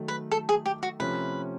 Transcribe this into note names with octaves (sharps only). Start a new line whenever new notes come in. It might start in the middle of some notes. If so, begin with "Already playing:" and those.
Already playing: D#3 F#3 A3
B4
A4
G#4
G4
F#4
C3 F3 A3 C#4 B4